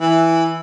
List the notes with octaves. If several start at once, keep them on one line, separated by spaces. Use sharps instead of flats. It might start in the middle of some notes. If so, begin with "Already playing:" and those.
E3